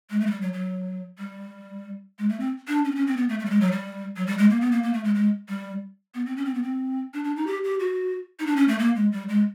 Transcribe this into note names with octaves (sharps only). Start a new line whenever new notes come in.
G#3
A3
G#3
G3
F#3
F#3
G3
G#3
A3
C4
D4
C#4
C4
C#4
C4
B3
A3
A3
G3
G#3
F#3
G3
F#3
G3
G#3
A#3
B3
A#3
A#3
A3
G#3
G#3
G3
B3
C4
C#4
C4
B3
C4
D4
D4
D#4
G4
G4
F#4
D#4
D4
C#4
A3
A#3
G#3
G3
G#3